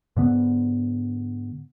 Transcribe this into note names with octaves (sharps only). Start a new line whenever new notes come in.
G#2 D3 B3